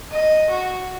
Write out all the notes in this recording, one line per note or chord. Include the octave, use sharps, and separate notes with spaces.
D#5
F#4